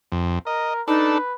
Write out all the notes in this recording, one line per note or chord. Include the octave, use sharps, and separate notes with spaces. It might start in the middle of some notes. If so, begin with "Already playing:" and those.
F2
A#4 D#5
D4 D#4 A4 B4